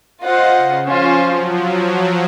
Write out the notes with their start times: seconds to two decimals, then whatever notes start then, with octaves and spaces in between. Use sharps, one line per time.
0.22 F4 C5 D#5 F#5
0.55 C#3
0.86 F3 C#4 F4 C5
1.18 F#3